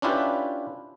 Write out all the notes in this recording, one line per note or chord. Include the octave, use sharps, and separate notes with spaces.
C#4 D4 E4 F4 G4 B4